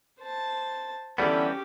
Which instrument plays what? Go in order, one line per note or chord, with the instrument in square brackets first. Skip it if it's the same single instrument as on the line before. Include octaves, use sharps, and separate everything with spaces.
[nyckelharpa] C5 A5
[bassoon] D3 [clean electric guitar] E3 G3 B3 [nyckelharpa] C#4 G4